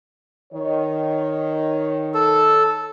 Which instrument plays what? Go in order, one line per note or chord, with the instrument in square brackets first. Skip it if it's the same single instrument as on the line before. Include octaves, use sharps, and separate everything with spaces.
[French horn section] D#3 C#5
[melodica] A4